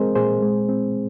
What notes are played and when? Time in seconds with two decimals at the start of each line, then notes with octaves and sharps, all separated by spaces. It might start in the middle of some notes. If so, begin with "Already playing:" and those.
Already playing: G#3 C4 G#4 A#4 C5 D#5
0.16 A#2 G#4 C5
0.42 G#3
0.69 C4